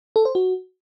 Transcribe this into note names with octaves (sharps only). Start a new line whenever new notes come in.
A4
C5
F#4